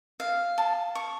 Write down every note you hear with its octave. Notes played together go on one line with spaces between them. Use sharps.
F5
A5
C#6